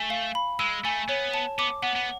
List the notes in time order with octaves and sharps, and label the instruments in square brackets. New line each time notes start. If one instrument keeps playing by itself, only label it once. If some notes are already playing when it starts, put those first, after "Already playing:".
Already playing: [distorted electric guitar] A3 [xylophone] G#5
[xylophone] F5
B5
[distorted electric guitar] G#3 [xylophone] E6
[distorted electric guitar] A3 [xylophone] G#5
[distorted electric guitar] B3 [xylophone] C#5
[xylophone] A5
[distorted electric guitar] B3 [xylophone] D6
[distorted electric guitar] B3 [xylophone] F#5
[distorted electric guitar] B3